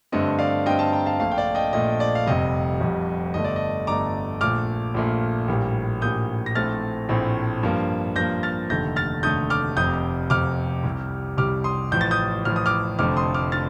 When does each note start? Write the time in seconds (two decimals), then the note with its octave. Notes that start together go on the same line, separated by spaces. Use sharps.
0.12 G2 D3 A3 C4 D#5
0.39 D5 F5
0.66 G2 D3 A3 C4 D#5 G5
0.79 F5 A5
0.92 G5 A#5
1.06 F5 A5
1.19 A#1 A#2 A3 F5 A5
1.32 G5
1.38 D5 F5
1.55 D#5 G5
1.73 A#1 A#2 A3 D#5
2.00 D5
2.15 F5
2.27 F1 F2 C3 G3 D#5
2.80 F1 F2 C3 G3
3.34 G1 G2 D3 A3 D#5
3.44 D5
3.56 D#5
3.87 G1 G2 D3 A3 A#5 D6
4.41 A#1 A#2 A3 D6 F6
4.94 A#1 A#2 A3
5.48 A#1 A2 G3 A#3
6.02 A#1 A2 G3 A#3 D#6 G6
6.46 A#6
6.55 A#1 A2 A3 C4 F6 A6
7.09 A#1 A2 A3 C4
7.63 G2 F3 A#3
8.16 G2 F3 A#3 G6 A#6
8.43 F6 A6
8.70 F1 D#2 D3 A3 G6 A#6
8.96 F6 A6
9.23 F1 D#2 D3 A3 D#6 G6
9.50 D6 F6
9.77 F1 F2 C3 D#6 G6
10.30 F1 F2 C3 D6 F6
10.84 C2 C3 G3
11.37 C2 C3 G3 D6 F6
11.64 C6 D#6
11.91 A1 A2 F3 G6
12.01 A6
12.11 D#6 G6
12.45 A1 A2 F3 F6
12.56 D#6
12.66 D6 F6
12.99 F1 F2 D3 F3 A3 D6 F6
13.16 C6 D#6
13.34 D6 F6
13.52 D3 F6 A6